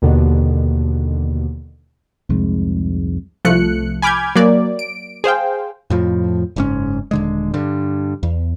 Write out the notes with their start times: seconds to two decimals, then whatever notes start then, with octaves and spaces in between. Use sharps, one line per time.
0.02 D#2 B2 D3
2.29 C2 F2 G#2 G#3
3.45 C2 F3 A3 F#6 C#7
4.02 G#5 B5 D6 F6 G6 G#6
4.36 F#3 A#3 D5
4.79 D7
5.24 G#4 C5 F5 G5
5.90 F2 A2 F3
6.56 F#1 G#2 C#4
7.11 D#1 D3 G#3
7.54 G2 D3
8.23 E2